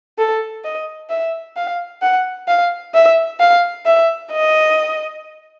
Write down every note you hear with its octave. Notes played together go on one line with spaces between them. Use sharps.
A4
D#5
E5
F5
F#5
F5
E5
F5
E5
D#5